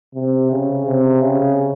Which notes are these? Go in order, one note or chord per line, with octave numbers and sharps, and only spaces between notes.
C3
C#3
C3
C#3